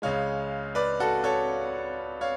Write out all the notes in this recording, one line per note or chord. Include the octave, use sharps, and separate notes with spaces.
C#2 C#3 G#3 C#5 F5
B4 D5
F#4 A4
A4 C#5
C#5 F5